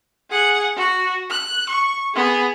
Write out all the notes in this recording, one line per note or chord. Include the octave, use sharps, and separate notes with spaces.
G#4 F#5
F#4
F#6
C#6
B3 G#4